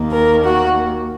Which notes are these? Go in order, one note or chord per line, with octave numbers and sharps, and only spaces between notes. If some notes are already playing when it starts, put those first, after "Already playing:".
Already playing: D#2 D#3 A#3
A#4
F#4